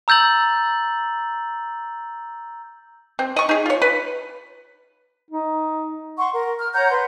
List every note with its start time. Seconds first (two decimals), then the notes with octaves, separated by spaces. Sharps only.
0.08 A#5 E6 G6 A6 F#7
3.19 C4
3.36 D#5 C#6
3.49 D#4 G#4
3.66 F4 C#5
3.82 B4
5.31 D#4
6.18 F#5 C6 C#6
6.33 A#4
6.58 F6
6.74 C#5 F#5 A#5 G6
6.91 B4 C6